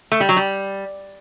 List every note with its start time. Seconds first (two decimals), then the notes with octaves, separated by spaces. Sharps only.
0.12 A3
0.20 G3
0.29 F#3
0.37 G3